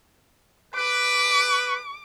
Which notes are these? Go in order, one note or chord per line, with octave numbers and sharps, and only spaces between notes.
B4 D6